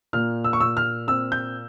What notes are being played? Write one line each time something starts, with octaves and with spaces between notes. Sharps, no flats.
A#2 F6
E6
C#6
A#2 E6
F6
C4 E6
G6